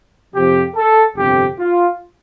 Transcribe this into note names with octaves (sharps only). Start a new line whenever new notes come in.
F2 C3 F3 G4
A4
G1 F2 C3 G4
F4